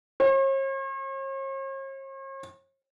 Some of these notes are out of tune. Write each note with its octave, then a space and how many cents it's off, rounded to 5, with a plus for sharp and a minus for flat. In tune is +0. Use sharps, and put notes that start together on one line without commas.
C#5 -45